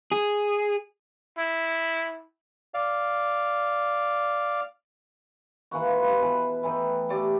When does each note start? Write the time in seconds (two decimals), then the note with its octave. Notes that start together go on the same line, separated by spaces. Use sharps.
0.12 G#4
1.38 E4
2.74 D5 F5
5.71 E3 A#3 F#5 C#6
5.86 F4
5.99 B4 B5
6.19 B2 E3
6.63 E3 A3 D#4 G5
7.09 A3 G4 D5